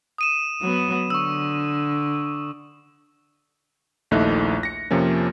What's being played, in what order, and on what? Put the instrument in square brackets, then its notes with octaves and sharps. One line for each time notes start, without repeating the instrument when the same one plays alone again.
[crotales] D#6 D#7 E7
[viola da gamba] F#3 B3
[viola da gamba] D3 [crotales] C#6 E6
[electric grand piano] A#1 D#2 A3 D#4 E4 F#6
A#6 C#7
F2 C3 F3 A#3 C#4